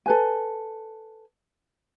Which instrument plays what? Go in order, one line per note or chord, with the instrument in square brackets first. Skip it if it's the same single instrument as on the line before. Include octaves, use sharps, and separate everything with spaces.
[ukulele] A4 B4 G#5